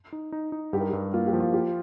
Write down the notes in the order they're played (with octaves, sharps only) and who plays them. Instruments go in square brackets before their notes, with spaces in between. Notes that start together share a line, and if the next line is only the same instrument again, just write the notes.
[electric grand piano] D#4
D#4
D#4
[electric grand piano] G2 [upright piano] G4
[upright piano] A#4
[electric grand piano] G2 [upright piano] G4
[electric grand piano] A#3 [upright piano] F4
[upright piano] G4
[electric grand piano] F3
[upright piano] F4
[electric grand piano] F4 [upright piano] G4